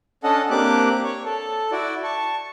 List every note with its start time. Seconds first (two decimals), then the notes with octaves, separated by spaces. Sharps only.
0.24 C#4 D4 A4 D#5 F#5 A5
0.50 A#3 C4 D4 G4 D6 F#6
1.04 C#5 C#6
1.26 A4 A5
1.72 E4 F#4 D5
2.04 A5 C#6